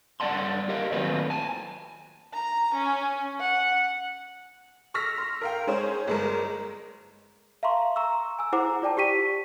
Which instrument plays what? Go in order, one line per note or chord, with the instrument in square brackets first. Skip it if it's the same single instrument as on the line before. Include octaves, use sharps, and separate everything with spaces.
[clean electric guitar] G2 B3 D5 F#5 A5 C6
G4 A#4 D#5 F5
D#2 A2 F#3 C4 F4 B4
G#5 A5
[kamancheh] A#5
C#4
F#5
[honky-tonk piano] C#6 E6 F6 A#6 B6
C6
A#4 F5 G5
G#3 C#4 G#4 C5
G1 G#3 A#4
[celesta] E5 F5 A5 A#5 C6 C#6
A#5 C#6 E6
G#5 E6
E4 G#4 C5 F#5 A#5 D6
F4 D5 G5 A5
G4 C#6 B6 D#7